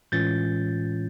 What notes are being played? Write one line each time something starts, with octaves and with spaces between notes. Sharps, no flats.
A2 E3 G#3 C#4 F4 G6 A6